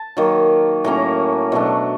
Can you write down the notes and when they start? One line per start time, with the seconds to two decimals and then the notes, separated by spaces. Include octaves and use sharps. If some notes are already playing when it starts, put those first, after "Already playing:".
Already playing: A5
0.17 D#3 F#3 A#3
0.84 A2 F#3 A#3 C#4 A#5
1.52 B2 F#3 A3 D4